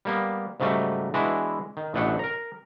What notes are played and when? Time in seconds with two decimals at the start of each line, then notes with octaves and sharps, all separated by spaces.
0.05 G3 A#3 B3
0.60 G#2 C#3 F#3 G3 A3
1.14 E3 G#3 B3 D4 E4 F#4
1.77 D#3
1.94 A1 B2 A3 D4 F#5
2.19 A#4 A#5